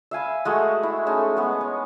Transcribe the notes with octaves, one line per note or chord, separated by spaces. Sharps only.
E5 F5 G#5 B5
G#3 A3 F#4
E4
G#3 A3 C#4 D#4
G#3 B3
C#5